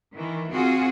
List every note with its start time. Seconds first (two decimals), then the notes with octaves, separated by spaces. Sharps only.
0.13 D#3 E3
0.52 C4 F4 F#4 G#4